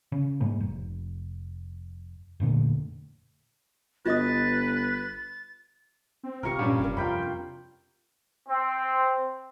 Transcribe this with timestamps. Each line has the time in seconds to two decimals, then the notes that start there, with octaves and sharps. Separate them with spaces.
0.12 C#3
0.40 G#2 G3 G#3 A#3
0.60 F1
2.40 F1 A#2 D3 A3
4.06 G1 F4 B4 D#5 D#6 A6
6.23 C4
6.43 C3 F4 G4 A#4 C#6
6.59 G2 A#2 G3 C#4
6.79 F#1 C4 D4 A#4
6.97 F2 F4 G5 B5
8.48 C4